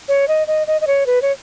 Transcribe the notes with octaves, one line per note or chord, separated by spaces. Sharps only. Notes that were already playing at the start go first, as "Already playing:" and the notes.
C#5
D#5
D#5
D#5
D#5
C#5
B4
C#5